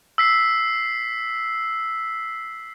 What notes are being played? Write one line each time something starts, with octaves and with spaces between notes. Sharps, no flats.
E6 B6 C7